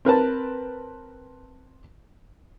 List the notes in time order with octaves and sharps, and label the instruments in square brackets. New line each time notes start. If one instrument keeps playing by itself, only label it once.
[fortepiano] C4 A#4 B4 A5